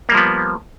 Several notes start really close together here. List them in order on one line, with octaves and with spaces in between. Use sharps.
A#3 G3 F3 B3